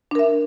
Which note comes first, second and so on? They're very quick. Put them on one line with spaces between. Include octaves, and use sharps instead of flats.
D4 A#4 E5